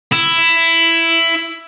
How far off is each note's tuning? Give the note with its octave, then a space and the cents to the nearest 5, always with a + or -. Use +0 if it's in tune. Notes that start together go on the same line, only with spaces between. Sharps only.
E4 +10